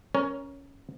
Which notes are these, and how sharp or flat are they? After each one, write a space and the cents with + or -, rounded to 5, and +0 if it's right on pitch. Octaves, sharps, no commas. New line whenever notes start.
C#4 +0 A#4 +15 C#5 +15